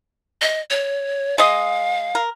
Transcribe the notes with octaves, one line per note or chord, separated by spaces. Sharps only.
D#5
C#5
G#3 D#5 F5
A#4